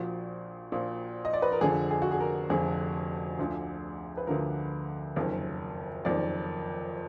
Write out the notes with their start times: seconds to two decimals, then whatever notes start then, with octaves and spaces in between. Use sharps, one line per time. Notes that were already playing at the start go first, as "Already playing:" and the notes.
Already playing: A#1 A#2 F3 F#4
0.72 A#1 A#2 F3
1.25 D#5
1.34 D5
1.42 B4
1.52 A#4
1.61 F1 F2 D3 F3 G#4
1.91 G#4
2.02 F#4
2.11 G#4
2.20 A#4
2.49 F1 F2 D3 F3 G#4
3.39 D2 D3 F3
4.17 B4
4.27 D2 D3 F3 A#4
5.16 F#1 F2 D#3
6.05 F#1 F2 D#3 D5